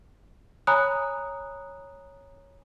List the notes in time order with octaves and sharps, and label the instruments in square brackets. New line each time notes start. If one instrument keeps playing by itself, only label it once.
[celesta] C#5 G#5 A#5 B5 D#6 F#6